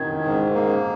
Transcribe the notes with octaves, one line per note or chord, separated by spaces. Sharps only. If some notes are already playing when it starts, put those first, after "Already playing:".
Already playing: D#3 G#6
G#2
A#3